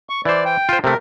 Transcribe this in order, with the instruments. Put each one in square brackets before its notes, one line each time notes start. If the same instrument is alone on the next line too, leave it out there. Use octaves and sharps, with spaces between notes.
[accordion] C#6
[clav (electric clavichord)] E3 C5 [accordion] D5
[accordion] G5
[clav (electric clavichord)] F4 C5
[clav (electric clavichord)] C3 A3 [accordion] A#4